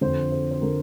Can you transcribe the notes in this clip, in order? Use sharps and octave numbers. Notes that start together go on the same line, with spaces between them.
F2 D3 C5
C5
C5
D3 A#4